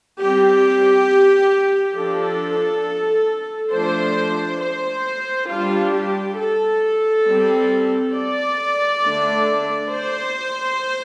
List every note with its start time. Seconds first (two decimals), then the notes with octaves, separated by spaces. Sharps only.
0.19 G3 C4 G4
1.96 F3 D4 A4
3.72 F3 A3 D4 C5
4.61 C5
5.49 G3 D4 F4
5.93 G4
6.38 A4
7.25 G3 C4
8.14 D5
9.03 D3 A3 D4
9.90 C5